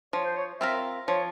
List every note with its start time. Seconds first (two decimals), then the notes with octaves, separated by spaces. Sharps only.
0.13 F3 C#5
0.24 C5
0.36 C#5
0.61 C4 F4 A#4 E5
1.08 F3 C#5